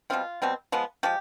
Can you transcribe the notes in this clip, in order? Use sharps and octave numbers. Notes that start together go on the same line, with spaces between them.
B2 G3 C4 F4
B2 G3 C4
F3 G#3 B3
F3 G#3 G4